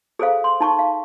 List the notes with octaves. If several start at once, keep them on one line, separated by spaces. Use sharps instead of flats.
G#4 A4 C5 F5
C6
D#4 A5 C#6
F5